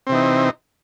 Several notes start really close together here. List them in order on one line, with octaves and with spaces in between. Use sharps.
C4 C3 E3 D#4